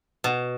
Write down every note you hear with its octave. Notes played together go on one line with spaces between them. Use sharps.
B2